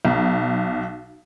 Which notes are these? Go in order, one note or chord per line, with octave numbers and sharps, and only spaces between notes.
B1